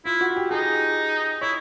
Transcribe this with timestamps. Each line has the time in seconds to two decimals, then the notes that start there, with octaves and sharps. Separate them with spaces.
0.05 E4 F4
0.21 F#4
0.36 G4
0.51 D#4 G#4
1.41 E4 C#5